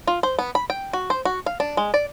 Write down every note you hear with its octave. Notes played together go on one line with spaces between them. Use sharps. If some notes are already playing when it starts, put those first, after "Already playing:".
F4
C5
B3
B5
G5
F#4
C5
F#4
F5
D4
G#3
D5